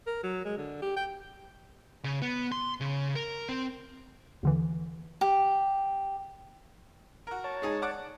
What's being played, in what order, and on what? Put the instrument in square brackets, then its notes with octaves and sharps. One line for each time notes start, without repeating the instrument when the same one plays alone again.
[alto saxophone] A#4
F#3
G#3
D3
G4
G5
[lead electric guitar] C#3
B3
C6
C#3
A#4
C4
[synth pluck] D#2 D3 E3
[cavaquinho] G4
[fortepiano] F#4 A#4
[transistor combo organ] C#5 A5
[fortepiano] G#3 D#4 G#4
D5 F#5 D6